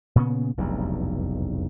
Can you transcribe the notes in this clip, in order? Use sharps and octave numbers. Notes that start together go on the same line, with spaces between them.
A#2 C#3 B3 C#4
F1 B1 E2 G2